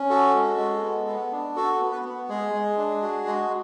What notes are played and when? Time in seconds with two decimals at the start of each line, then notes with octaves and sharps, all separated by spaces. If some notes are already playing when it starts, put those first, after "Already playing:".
Already playing: C#4
0.10 F#4 A4
0.35 G#3
0.58 G#3
0.83 B3
1.07 B3
1.32 D4
1.56 F#4 A4
1.81 B3
1.92 B4
2.05 B3
2.29 G#3 G#4
2.53 G#3
2.77 D4
3.02 F#4
3.26 G#3